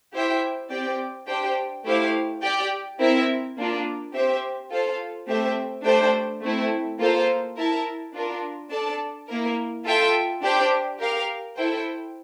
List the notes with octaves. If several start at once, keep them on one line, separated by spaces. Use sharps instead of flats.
E4 G4 C5 E5 G5
C4 G4 D5 G5
D4 G4 C5 G5
A3 E4 G4 C5 F5
G4 D5 G5
C4 E4 A#4 E5
A#3 D4 F4
C4 G4 C5 E5 G5
F4 A4 C5 F5
A3 C4 G4 C5 E5
A3 D4 G4 C5 G5
A3 C4 E4
A#3 F4 A4 C5 F5
E4 A#4 E5 A5
D4 F4 A#4
D4 A4 D5 A5
A#3 E4 A#4
F4 A4 E5 G5
D4 G4 C5 G5
G4 A#4 F5
E4 A4 C5 G5